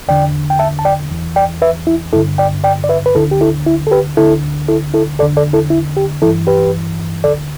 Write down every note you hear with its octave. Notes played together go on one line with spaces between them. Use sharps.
E2 D3 D5 G5
G5
E5 A5
A5
D5 G5
E2 E3
D5 G5
B4 E5
E4
G2 D3 E4 A4
D5 G5
D5 G5
D5
B4 E5
B4
D2 D3 E4 A4
G4
E4 A4
E4
A4
G4 B4
D2 D3 E4 A4
E4 A4
E4 A4
E2 D3 A4 D5
A4 D5
E4 A4
E4
G4
G2 E3 E4 A4
G4 B4
D2 D3 A4 D5